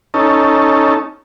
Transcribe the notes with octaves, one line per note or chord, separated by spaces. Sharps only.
C#4 D#4 A4